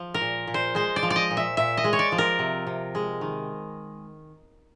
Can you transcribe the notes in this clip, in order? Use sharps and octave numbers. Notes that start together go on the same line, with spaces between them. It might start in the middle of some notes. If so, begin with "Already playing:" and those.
Already playing: F3
A#4
A#2
A#2
C5
G#3 C5
D5
F3
D5
D#5
A#2
E5
A#2 E5
D#5
G#3
C#5
D5
F3
A#4
C3
C3
G#3
D#3